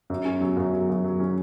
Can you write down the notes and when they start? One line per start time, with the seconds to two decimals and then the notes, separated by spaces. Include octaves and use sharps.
0.10 F#2
0.25 C#4
0.41 F#3
0.57 F#2
0.74 F#3
0.89 F#2
1.04 F#3
1.20 C#4